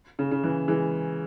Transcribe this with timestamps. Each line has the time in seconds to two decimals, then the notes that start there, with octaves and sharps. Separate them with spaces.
0.19 C#3
0.31 C#3
0.44 E3
0.68 E3 G#3